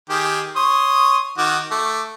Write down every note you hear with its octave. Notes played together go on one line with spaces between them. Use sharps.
D#3 G4 G#4
C#5 C6 D#6
D#3 F#4 D6
A3 D6